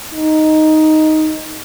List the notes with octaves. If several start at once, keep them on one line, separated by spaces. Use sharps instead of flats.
D#4